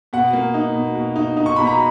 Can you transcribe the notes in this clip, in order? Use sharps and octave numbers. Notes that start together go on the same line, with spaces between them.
B2 F#5
A#3
D#4
B2
B2
D#4
D#4
C#6
B2 B5
A#5